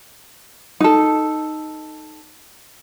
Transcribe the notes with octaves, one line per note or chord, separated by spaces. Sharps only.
D#4 A4